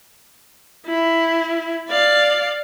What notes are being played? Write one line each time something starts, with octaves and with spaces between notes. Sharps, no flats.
E4
D5 F5